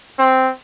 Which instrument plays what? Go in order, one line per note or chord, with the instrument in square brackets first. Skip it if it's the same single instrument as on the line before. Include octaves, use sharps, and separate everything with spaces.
[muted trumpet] C4